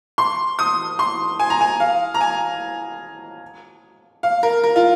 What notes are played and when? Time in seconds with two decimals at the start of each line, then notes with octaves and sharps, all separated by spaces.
0.18 C6
0.59 D#6
0.99 C6
1.39 G#5
1.50 A#5
1.61 G#5
1.80 F5
2.14 A#5
2.21 G#5
4.23 F5
4.43 A#4
4.63 A#4
4.76 F4